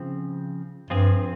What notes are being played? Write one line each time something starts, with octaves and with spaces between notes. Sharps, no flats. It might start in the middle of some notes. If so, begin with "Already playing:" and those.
Already playing: C#3 F3 C4
G2 F3 C4 F4 G#4